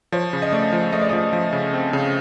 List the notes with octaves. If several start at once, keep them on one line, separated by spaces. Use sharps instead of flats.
F3 C#5
C#3
D#5
A3 D5
F3
A3 D#5
D5
F3 D#5
F3
C#3
C4
C#3